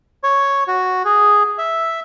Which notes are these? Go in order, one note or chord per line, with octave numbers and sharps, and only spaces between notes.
C#5
F#4
G#4
E5